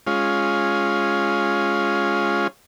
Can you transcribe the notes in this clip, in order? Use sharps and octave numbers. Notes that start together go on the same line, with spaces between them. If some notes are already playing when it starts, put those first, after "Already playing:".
G#3 C#4 F4